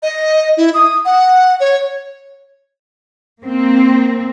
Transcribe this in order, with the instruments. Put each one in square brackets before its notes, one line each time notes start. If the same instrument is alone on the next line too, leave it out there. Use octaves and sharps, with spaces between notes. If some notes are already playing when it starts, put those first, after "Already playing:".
[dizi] D#5
E4
D#6
F#5
C#5
[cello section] A#3 C4